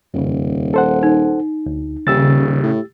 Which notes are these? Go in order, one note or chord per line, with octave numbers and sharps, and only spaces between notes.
D#1 F2 C#3
A4 C5 F#5
D#4
D2
D#1 C#3 G4 E6 A6
A2